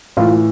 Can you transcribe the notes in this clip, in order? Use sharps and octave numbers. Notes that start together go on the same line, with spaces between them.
A2 E3 F4